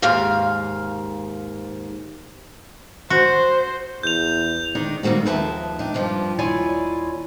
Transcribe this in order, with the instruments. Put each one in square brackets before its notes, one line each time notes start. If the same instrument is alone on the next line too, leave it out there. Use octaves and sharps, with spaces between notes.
[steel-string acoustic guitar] D#2 G#2 F5
[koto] F#4 [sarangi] C5
[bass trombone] E2 [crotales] G6 F7
[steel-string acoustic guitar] D#3 D4 D#4
D#3 G3 A#3 C4 F#4
D#2 F3 B4 E5 G5 A5
D4 D#4
G2 A#2 F3 F4 G4
D#2 E4 F4 C#5 D5 G#5